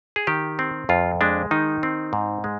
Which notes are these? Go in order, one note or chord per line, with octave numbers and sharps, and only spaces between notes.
G#4
D#3 G4
C4
F2 F4
G#3 D4
D#3 D#4
C4
G#2
G#3